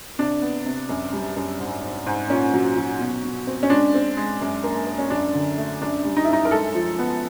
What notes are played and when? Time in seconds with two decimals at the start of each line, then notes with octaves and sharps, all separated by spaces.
0.19 C3 D4
0.42 B3
0.65 C3
0.89 F#2
1.13 G3
1.36 F#2
1.59 G#2
1.83 G#2
2.06 G#2
2.30 A#2 C#4
2.54 F#3
2.77 F#3
2.99 B2
3.23 B2
3.47 C4
3.63 C#4
3.70 G#3 D4
3.94 C4
4.17 G#3
4.41 F#2
4.64 A#3
4.87 A#3
4.99 C#4
5.10 F#2 D4
5.34 D3
5.58 A3
5.82 F#2 D4
6.05 G3
6.16 D#4
6.25 E4
6.29 F#2 D#4
6.45 A#4
6.51 G#3 A4
6.75 F3
6.99 B3